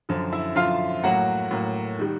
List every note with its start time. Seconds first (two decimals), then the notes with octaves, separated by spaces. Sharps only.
0.09 F#2 D3 F3
0.33 E4 E5
0.56 F#2 D3 F3 F4 F5
1.03 A2 F#3 A#3 F#4 F#5
1.51 A2 F#3 A#3
1.99 D#3 G3